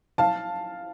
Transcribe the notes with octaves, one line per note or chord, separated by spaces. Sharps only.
F5 A5